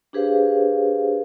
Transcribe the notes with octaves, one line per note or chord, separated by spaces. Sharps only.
D4 G4 G#4 B4 C5 F5